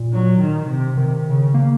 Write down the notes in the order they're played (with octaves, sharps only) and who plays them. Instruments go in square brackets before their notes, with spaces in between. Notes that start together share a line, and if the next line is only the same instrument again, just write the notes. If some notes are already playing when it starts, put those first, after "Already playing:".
Already playing: [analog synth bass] A#2
[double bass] F#3
D#3
C3
[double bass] C3 [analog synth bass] D#3
[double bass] C#3
[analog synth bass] A#3